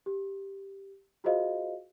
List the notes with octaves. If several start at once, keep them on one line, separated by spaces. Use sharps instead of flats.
G4
F4 F#4 G#4 C5 D#5 F5